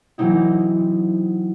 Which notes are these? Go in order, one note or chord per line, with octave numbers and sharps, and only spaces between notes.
E3 F#3 A#3 C4 D#4 E4